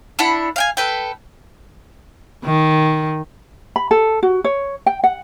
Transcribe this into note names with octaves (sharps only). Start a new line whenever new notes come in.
D4 E4 F#5 B5
F5 G5 G#5
A4 B4 G5
D#3
B5
A4
F#4
C#5
G5
F#5